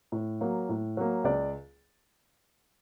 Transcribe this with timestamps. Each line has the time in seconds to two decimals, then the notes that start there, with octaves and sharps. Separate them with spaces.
0.12 A2
0.41 F#3 A#3
0.69 A2
0.97 F#3 A#3
1.24 C#2 D5